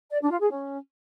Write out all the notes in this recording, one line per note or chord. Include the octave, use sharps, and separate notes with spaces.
D5
D4
F4
G#4
C#4